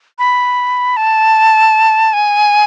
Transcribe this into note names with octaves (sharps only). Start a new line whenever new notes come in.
B5
A5
G#5